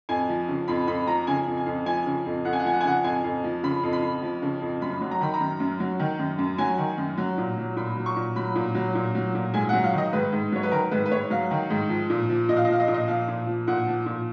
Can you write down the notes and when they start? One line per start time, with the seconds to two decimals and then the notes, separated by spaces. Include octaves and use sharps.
0.09 F2 G#5
0.29 F3
0.48 C#3
0.68 F2 B5
0.87 F2 B5
1.07 F3 A#5
1.27 C#3 G#5
1.47 F2
1.57 G#5
1.66 F2
1.86 F3 G#5
2.06 C#3
2.26 F2
2.45 F2 F#5
2.53 G#5
2.59 F#5
2.65 F3 G#5
2.73 F#5
2.81 G#5
2.85 C#3 F#5
3.04 F2 G#5
3.24 F2
3.44 F3
3.63 C#3 B5
3.83 F2
3.93 B5
4.02 F2
4.23 F3
4.42 C#3
4.61 F2
4.82 F#2 B5
5.01 F#3
5.11 A#5
5.21 D#3 B5
5.34 A#5
5.40 F#2
5.60 F#2
5.80 F#3
6.00 D#3
6.19 F#2
6.39 F#2
6.58 F#3 G#5
6.78 D#3
6.98 F#2
7.18 F#3
7.38 A#2
7.57 F#3
7.77 A#2 B5
7.96 F#3
8.06 C#6
8.16 A#2
8.36 F#3 B5
8.55 A#2
8.75 F#3
8.95 A#2
9.15 F#3
9.35 A#2
9.54 G#2 G#5
9.69 F#5
9.73 F#3
9.83 F5
9.93 D#3 D#5
10.13 G#2 B4
10.32 G#2
10.52 F#3 C#5
10.63 B4
10.72 D#3 A#4
10.91 G#2 B4
11.06 B4
11.11 G#2 C#5
11.30 F#3 F5
11.51 D#3
11.70 G#2
11.89 F3
12.10 A#2
12.29 F3
12.49 A#2 D#5
12.57 F5
12.65 D#5
12.68 F3 F5
12.80 D#5
12.88 A#2 F5
12.94 D#5
13.08 F3 F5
13.28 A#2
13.47 F3
13.67 A#2 F#5
13.87 F3
14.06 A#2